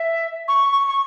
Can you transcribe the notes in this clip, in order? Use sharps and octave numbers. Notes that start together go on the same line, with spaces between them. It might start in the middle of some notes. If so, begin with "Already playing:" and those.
Already playing: E5
C#6
C#6
C#6